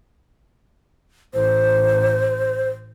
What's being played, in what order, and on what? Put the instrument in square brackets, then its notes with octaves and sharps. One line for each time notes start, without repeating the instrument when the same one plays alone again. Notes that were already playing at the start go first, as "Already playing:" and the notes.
[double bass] A1 [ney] C5